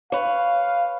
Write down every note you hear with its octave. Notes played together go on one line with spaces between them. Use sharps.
B4 C#5 F5